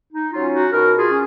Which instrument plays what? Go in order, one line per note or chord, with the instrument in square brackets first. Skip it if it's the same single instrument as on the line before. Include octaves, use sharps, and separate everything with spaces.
[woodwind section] D#4
F#3 C#4 F4
D#4 F#4
B2 F#4 A#4
F4 G#4
C#4